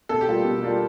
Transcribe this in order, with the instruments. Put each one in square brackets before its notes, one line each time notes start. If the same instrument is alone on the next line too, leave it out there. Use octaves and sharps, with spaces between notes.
[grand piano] B2 [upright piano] A4
[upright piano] G4
[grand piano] G3 A#3 D4 F4
B2
G3 A#3 D4 F4